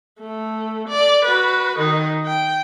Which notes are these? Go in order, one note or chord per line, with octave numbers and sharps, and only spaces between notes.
A3
D5
F#4 B4
D#3 D#4
G5